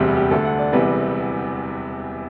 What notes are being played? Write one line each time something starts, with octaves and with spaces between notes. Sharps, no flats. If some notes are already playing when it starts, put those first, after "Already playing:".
Already playing: E1 D2 C3 G3 G4
G4
D2 D3 A3 A4
F#5
D5
E1 E2 C3 E3 G3 B4